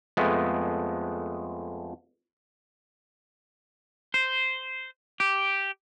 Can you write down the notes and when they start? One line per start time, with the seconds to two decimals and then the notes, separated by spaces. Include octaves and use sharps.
0.17 F2 G#3 A3 B3
4.14 C5
5.20 G4